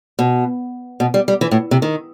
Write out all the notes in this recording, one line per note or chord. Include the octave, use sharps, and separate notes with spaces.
B2
B2
G3
G3
E3
A2
C3
D#3